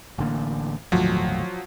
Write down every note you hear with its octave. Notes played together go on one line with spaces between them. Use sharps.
A1 D3 A#3
G1 D#2 A2 F3 F#3